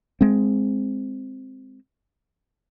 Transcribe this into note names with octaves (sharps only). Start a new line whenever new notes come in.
G#3 C4